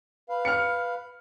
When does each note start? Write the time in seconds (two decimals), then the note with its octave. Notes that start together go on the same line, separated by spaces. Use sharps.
0.29 B4 F5
0.45 F6 C#7